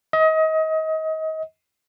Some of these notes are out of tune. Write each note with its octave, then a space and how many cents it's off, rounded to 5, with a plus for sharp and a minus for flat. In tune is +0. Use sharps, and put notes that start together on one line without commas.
D#5 +30